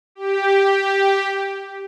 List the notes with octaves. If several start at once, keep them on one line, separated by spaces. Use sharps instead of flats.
G4